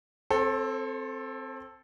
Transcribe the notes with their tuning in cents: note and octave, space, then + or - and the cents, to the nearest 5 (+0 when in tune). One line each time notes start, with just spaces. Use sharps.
C4 +0 A4 +0 C5 +45